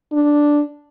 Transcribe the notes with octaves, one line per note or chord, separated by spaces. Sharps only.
D4